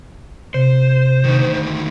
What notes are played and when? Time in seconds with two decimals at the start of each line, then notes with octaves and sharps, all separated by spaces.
0.54 C3 C5
1.24 D2 D#3